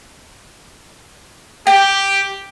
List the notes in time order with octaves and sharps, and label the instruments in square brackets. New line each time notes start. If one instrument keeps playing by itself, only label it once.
[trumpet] G4 [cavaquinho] G5